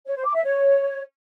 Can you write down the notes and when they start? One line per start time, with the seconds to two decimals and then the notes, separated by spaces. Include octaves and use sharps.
0.07 C#5
0.16 C5
0.26 D6
0.35 E5
0.44 C#5